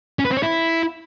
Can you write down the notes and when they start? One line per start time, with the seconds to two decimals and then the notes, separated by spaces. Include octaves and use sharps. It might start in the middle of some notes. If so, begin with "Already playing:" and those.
0.19 C#4
0.25 B4
0.31 C4
0.37 C#5
0.43 E4